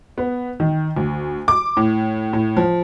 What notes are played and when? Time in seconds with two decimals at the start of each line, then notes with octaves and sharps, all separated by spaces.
0.18 B3
0.60 D#3
0.97 D2
1.48 D6
1.77 A2
2.33 A2
2.57 F3